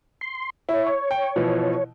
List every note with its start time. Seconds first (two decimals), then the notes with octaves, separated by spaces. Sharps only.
0.21 C6
0.69 E4 C#5
0.87 C#6
1.11 G5
1.36 B2 E3 F3